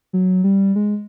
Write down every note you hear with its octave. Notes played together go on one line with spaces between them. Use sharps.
F#3
G3
G#3